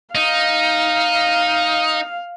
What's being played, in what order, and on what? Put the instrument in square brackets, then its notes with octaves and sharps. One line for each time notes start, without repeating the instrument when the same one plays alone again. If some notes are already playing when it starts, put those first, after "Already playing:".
[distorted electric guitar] D#4 [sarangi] F5